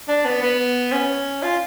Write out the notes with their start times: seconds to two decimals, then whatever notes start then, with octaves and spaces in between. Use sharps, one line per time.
0.08 D4
0.25 B3
0.42 B3
0.92 C#4
1.43 F4